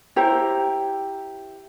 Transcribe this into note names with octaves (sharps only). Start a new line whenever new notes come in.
E4 G4 C5 A#5